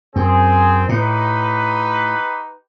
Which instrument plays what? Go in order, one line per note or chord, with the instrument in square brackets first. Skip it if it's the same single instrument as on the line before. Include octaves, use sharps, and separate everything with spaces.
[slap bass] F#2 [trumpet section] C4 G#4
[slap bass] A2 [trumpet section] D#4 G4 B4